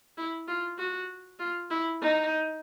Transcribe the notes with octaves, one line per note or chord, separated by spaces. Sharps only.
E4
F4
F#4
F4
E4
D#4